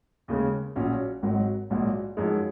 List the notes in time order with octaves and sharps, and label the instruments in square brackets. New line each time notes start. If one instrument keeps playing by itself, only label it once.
[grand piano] D#2 C#3 G#3
A#1 A#2 F#3 C#4
G#1 G#2 F#3
A#1 G#2 F#3 A#3
F#2 F3 G#3 D#4